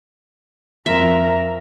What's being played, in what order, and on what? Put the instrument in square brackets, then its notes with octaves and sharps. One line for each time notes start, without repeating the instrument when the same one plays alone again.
[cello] F2 A#4 [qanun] E5